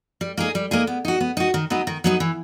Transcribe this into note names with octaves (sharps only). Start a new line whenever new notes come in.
G3
A#3 D#4 G#4
G3
A#3 D#4 G#4
B3
D#4 F#4
B3
D#4 F#4
D#3
F#3 B3 D#4
D#3
F#3 B3 D#4
E3